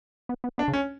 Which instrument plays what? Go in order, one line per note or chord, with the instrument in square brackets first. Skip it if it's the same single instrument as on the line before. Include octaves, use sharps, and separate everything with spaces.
[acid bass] B3
B3
[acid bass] B3 [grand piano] D4
[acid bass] C#3
[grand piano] C#4